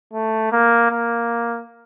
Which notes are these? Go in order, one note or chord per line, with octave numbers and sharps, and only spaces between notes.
A3
A#3
A#3